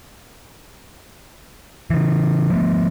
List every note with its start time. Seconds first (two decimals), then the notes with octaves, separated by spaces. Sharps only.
1.90 C#3 E3
2.50 F3 A3 B3